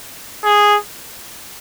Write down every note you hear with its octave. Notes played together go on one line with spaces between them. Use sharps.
G#4